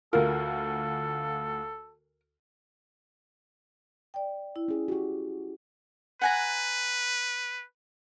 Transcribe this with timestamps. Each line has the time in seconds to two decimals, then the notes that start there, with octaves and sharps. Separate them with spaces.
0.13 D2 F4 A4 A#4
4.14 D5 G5
4.56 E4
4.68 C#4 G#4
4.88 F#4 G4
6.22 B4 F#5 G#5 A#5